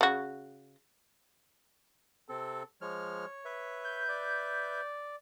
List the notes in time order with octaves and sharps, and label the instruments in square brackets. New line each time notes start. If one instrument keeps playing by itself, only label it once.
[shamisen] C#3 F#4
[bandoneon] C3 C4 A4
[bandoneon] F3 G#3 F6 [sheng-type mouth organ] C#5
[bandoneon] B4 E5
[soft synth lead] G6
[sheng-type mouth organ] D5